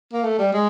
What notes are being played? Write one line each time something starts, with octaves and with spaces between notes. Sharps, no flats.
A#3
A3
G3
G#3